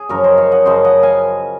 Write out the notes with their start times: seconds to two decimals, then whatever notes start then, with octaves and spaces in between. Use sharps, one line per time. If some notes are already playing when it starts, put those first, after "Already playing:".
Already playing: G#4
0.09 F#2 C#3 F3 A#4 C#5
0.24 C5 D#5
0.38 C#5 F5
0.52 D#5 F#5
0.66 F#2 C#3 F3 C5 D#5
0.84 D#5 F#5
1.03 F5 G#5